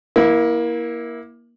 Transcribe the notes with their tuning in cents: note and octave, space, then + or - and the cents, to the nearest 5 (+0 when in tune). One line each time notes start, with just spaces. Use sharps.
A#3 +20 E4 -10